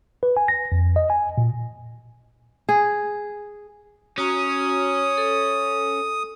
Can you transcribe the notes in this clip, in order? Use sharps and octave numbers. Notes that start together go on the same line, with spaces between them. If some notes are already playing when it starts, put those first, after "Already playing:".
B4
G#5
A#6
F2
D#5
G#5
A#2
G#4
C#4 F#4 A#5 D#6
A4